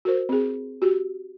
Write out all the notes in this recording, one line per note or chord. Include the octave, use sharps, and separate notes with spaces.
F#4 A#4 C5
C4 G#4
F#4 G4